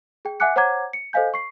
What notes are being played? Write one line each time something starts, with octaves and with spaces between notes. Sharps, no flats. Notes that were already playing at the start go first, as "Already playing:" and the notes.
G#4 G5
E5 F#5 G#5 D6 F#6 C#7
C5 C#5 F#5 A#5 D6 G#6
C#7
A4 C5 D#5 F5 G#5 G6
C#6 C7